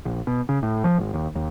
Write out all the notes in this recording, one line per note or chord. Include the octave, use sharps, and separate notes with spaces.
A#1
B2
C#3
A2
F3
G#1
D#2
D#2